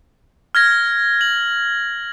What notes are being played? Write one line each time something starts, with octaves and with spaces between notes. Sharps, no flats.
F6 G#6 A#6
F#7